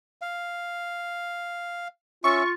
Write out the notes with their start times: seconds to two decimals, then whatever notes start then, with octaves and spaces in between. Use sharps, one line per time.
0.22 F5
2.24 C#4 F4 E5 C#6